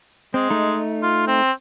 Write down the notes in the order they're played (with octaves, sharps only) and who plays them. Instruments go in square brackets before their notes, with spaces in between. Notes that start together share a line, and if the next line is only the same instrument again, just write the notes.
[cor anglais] G#3 [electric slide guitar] C4
[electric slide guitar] A3 D#4
[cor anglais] F4
C4